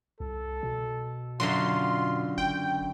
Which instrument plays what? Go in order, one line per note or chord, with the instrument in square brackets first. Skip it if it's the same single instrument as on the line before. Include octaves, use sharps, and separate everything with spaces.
[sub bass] C2 [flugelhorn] A4
[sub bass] B2
[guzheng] F#2 D3 F#3 [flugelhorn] F4 [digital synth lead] C6
[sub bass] F#1 [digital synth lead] G5